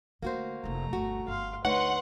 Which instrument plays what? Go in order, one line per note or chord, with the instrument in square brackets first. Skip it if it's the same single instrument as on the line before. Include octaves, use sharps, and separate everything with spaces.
[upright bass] D3 A3 [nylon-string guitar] A#3 F#4 C5
[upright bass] F1 F3 [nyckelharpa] A3 A#5
[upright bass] G1 D2 [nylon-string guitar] F#4
[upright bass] G1 [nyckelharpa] F5 C6
[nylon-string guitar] D2 D#4 C#5 [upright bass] A3 [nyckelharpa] B4 C6 [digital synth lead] F#5